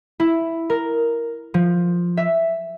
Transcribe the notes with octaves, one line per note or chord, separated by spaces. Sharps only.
E4
A#4
F3
E5